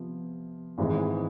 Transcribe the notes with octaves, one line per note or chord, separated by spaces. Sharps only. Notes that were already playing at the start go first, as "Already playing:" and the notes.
Already playing: C3 F3 B3
G#1 G#2 E3 G#3